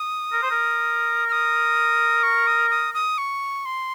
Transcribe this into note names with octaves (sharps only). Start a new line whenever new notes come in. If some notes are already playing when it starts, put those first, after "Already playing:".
Already playing: D#6
A#4
C5
A#4
F6
D#6
C#6
D#6
D#6
D#6
C#6
C6